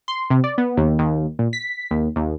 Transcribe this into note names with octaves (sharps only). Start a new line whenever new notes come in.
C6
C3
D5
B3
D#2
D#2
A#2
B6
D#2
D#2